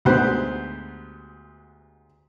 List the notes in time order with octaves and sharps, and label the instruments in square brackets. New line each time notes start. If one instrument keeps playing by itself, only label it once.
[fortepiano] D2 G#2 B3 G4 C5 F#6